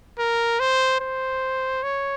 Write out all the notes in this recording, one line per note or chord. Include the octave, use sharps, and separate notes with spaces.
A#4
C5
C5
C#5